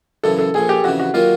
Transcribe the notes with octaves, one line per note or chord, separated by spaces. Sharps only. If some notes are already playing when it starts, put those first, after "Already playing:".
F#2 C#3 E3 A4
A4
A#1 A#2 F3 G#4
G4
F2 C#3 E3 F#4
F#4
D#3 F#3 A#3 F4